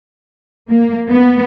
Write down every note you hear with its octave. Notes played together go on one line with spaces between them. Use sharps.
A#3
B3